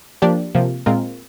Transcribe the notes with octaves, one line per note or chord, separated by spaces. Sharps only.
F3 A#3 D4 G4 D5
C3 F3 A#3
A#2 G#3 C4 F4 A#4